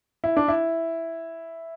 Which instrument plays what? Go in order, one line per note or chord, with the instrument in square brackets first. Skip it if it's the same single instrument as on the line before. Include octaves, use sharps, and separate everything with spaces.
[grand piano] E4
D4
E4